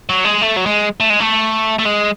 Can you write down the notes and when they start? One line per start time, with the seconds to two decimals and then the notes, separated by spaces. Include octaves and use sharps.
0.09 F#3
0.25 G#3
0.42 A3
0.57 F#3
0.66 G#3
1.00 A3
1.10 G#3
1.20 A3
1.79 A3
1.86 G#3